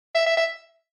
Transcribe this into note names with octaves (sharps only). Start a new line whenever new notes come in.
E5
E5
E5